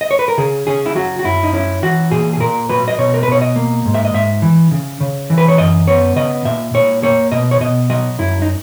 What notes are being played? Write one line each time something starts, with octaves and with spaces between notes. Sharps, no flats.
D#5
C#5
B4
A#4
C#3 G#4
C#3 G#4
E4
F#3 F#4
F#4
F#2 E4
D#4
C#4 E4
E3 F#4
A#2 G#4
G#4
A#2 A#4
F#3 B4
D#5
B2 C#5
A#4
B4
B2 C#5
D#5
A#3
G#2
E5
D#5
G#2 E5
E3
C#3
C#3
E3
B4
C#5
F#2 D#5
B3 C#5
C#3 D#5
A#2 E5
A#2 C#5
A#3 C#5
B2 D#5
C#5
B2 D#5
F#3 D#5
F#2 E4
D#4